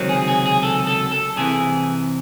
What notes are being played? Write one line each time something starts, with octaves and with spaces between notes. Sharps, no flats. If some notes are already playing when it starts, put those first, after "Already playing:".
Already playing: C#2 C3 D#3 F#3 C4
G#4
G#4
G#4
A4
A4
A4
C2 C3 E3 G#4